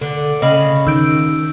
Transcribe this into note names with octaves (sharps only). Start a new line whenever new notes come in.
D3
C#3 D#5 B5
D#3 E6 G6 D7